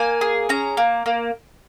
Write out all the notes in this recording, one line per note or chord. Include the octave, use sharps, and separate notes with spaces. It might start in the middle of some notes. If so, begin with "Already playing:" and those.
Already playing: A#3 G#5
G#4
C#4 A#5
A#3
A#3